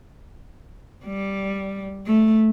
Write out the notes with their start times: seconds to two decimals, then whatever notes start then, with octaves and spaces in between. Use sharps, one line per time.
1.06 G3
2.06 A3